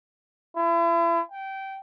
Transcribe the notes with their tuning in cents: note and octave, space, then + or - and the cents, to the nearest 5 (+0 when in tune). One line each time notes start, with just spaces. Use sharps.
E4 +40
G5 -20